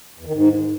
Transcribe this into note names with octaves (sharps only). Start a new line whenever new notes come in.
E2
D#3
G#2